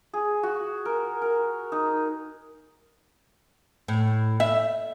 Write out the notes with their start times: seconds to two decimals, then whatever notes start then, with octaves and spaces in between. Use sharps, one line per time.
0.14 G#4
0.43 F#4
0.85 A#4
1.22 A#4
1.72 D#4
3.88 A2
4.40 E5